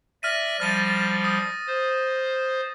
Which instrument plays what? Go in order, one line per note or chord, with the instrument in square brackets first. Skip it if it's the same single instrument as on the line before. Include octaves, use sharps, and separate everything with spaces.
[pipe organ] D5 E5 [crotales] F6 A#6 D#7
[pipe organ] F3 G3 [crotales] F6 A6 D#7
[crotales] D#6
[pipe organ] C5